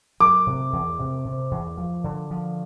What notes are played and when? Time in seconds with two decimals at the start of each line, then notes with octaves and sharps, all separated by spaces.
0.20 F#3 D6
0.47 C3
0.73 E2
0.99 C3
1.25 C3
1.51 E2
1.78 F3
2.04 D3
2.31 F3